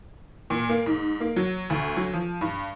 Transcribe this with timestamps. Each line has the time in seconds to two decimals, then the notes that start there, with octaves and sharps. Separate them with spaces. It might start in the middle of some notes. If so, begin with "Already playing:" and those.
0.50 A#2
0.69 A#3
0.86 G#2
1.20 A#3
1.36 F#3
1.70 D2
1.97 F#3
2.13 F3
2.41 G2